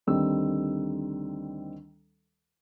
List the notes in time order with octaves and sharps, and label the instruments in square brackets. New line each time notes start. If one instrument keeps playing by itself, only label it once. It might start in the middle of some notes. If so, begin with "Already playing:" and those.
[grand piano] D2 D#3 G3 C4 E6